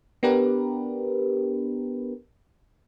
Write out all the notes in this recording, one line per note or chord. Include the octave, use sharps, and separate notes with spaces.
B3 D4 G4 A#4 B4